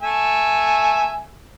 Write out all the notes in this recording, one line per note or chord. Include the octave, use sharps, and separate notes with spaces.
A3 E5 G#5